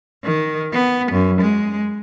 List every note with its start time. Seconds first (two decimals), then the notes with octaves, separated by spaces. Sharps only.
0.24 D#3
0.73 B3
1.12 F#2
1.41 G#3